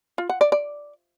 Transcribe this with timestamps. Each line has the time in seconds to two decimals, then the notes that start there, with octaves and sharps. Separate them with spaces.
0.18 F4
0.30 F#5
0.41 D5
0.52 D5